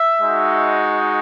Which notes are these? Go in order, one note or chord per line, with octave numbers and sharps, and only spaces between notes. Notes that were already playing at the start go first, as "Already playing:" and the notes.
Already playing: E5
G#3 D#4 F#4